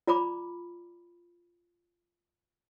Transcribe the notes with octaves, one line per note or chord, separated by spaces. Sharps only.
F4 D5 A#5 B5 D6